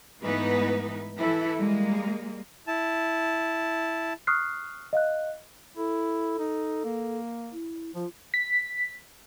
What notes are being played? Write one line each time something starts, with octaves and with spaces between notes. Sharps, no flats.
G#2 E3 A3 B3 D#4 B4
E3 E4 A4
G3 G#3 A#3
E4 A5
C#6 D#6 F6 F#6 C7
D#5 F5 F#6
E4 A4
D#4
A#3
E4
F3 F4
B6